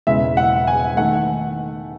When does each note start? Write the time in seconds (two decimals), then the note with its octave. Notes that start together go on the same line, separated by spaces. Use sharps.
0.07 E1 E2 C#3 G#3 E5
0.37 F#5
0.67 G#5
0.97 D#3 A3 F#5